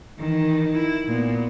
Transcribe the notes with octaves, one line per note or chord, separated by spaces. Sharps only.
D#3 E3
E4
A#2 B3